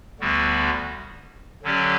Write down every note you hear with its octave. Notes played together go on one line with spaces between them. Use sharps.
D2 D3 G3 B3 F#4
D3 F#3 C#4 G4 D5